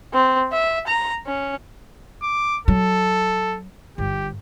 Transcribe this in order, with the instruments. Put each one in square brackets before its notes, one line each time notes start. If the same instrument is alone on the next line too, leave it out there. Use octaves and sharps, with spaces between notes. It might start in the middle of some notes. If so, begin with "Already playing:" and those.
[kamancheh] C4
E5
A#5
C#4
[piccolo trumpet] D6
[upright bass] F#3 [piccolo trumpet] A4
[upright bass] G1 [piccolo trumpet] G4